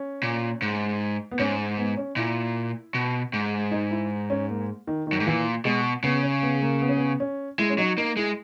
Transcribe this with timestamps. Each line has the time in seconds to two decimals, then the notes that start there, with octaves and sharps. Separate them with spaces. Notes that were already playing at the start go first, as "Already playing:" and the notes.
Already playing: C#4
0.23 A#2
0.62 G#2
1.31 B3
1.39 G#2 C#4
1.78 B3
1.97 C#4
2.16 A#2 E4
2.94 B2
3.33 G#2
3.71 D#4
3.91 E4
4.30 C#4
4.49 A#3
4.87 D#3
5.07 D#3
5.12 F#2
5.20 G#2
5.27 A#2 E3
5.65 B2 G#3
6.03 C#3 B3
6.23 C#4
6.43 B3
6.62 A#3
6.81 B3
6.89 C#4
6.97 B3
7.20 C#4
7.58 G#3 E4
7.70 C#4
7.78 F#3 D#4
7.98 A#3 D#4
8.17 G#3 E4